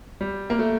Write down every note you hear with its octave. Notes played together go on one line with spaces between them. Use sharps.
G3
A#3
A3